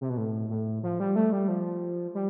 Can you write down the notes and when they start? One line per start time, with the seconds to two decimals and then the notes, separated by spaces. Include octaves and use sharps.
0.01 C3
0.10 B2
0.17 A2
0.49 A2
0.83 F3
1.00 G3
1.16 A3
1.32 G3
1.48 F3
2.15 G3